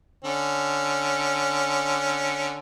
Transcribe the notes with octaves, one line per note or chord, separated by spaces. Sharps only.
D3 C#4